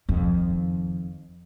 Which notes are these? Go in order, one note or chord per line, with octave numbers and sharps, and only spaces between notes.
F2 D#3